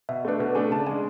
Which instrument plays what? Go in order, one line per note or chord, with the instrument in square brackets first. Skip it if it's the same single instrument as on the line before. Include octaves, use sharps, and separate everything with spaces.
[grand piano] B2 [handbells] E5
[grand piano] A3 D4 [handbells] B4
[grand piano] B2 [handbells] A4
[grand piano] A3 D4 [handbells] G#5
[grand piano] C#3 [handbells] A5
[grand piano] G#3 D4 [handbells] G#5